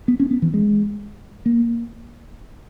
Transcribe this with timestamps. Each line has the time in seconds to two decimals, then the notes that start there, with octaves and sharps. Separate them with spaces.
0.08 B3
0.20 C#4
0.31 B3
0.42 E3
0.54 G#3
1.46 A#3